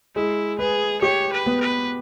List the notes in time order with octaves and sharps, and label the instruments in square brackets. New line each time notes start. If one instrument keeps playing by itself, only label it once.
[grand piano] G#3 [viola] E4
[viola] G#4 [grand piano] B4
[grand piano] G4 [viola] C#5
[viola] B4
[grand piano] B3
[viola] B4